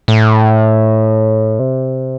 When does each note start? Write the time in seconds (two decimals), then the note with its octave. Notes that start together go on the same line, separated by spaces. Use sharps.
0.08 A2
1.59 C3